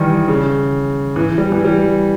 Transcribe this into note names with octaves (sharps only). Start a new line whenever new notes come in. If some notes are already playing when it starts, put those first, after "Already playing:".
Already playing: D#3 E3 G3
C#3
E3
G3
E3
G3